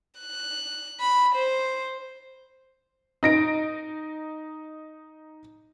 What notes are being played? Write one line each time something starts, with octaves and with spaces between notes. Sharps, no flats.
F#6
B5
C5
D#4 A#6 D7